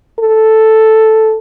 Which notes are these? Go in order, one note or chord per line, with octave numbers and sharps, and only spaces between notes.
A4